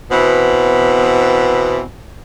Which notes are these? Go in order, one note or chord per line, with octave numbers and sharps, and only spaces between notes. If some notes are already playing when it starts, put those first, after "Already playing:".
B2 E3 B3 C4